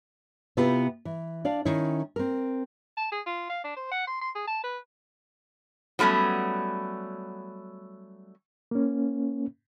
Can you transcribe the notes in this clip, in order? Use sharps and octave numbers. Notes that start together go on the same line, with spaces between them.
C3 B3 E4 F4 G4 B4
E3
D4 D5 F5
D#3 C#4 E4
C4 A#4
A5
G#4
F4
F5
D4
C5
F#5
C6
C6
G#4
A5
B4
F#3 G3 A3 B3 C#4
A#3 C#4